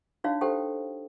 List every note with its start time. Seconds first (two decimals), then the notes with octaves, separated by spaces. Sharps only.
0.24 D4 D#4 F#4 C#5 F5
0.41 G4 A4 C5 G5